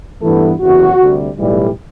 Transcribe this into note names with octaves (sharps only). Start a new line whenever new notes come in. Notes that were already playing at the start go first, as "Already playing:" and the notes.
G2 E3 A3 B3 E4 A4
F#1 E2 C3 F#3 F#4
D2 C3 G3
B1 A2 E3 G3